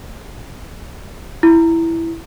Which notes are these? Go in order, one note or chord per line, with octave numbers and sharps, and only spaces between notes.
E4